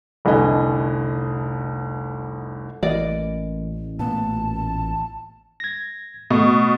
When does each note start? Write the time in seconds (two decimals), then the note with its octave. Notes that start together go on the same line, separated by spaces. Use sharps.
0.25 F1 C2 D3 B4 D#5 G#5
2.83 A1 E3 A#3 D5 D#5
3.99 A#2 B3 A5
5.60 G#6 A#6
6.31 B2 A3